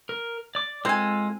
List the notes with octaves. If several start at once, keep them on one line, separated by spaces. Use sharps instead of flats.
A#4
D5 D6
G#3 C4 F4 A4 G#5